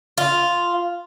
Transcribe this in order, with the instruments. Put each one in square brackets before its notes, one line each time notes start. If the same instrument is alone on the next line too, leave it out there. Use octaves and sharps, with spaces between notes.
[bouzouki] F4